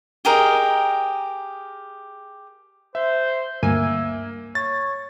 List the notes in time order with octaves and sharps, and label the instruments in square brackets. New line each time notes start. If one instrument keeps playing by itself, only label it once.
[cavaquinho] G4 G#4 A#4 D#5
[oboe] C5 [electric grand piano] E5
[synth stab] D2 G2 G#5 [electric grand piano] A#3 [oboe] E5
[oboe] C#5 [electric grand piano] A6